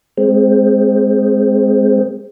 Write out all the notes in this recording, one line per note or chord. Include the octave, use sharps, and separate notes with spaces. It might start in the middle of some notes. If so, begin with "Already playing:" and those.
G#3 C4